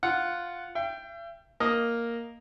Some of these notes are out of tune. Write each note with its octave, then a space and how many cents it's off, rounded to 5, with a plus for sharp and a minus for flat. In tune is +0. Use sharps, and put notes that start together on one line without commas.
F4 +0 F#5 +0
E5 +45 G5 +0
A#3 +0 D#5 +0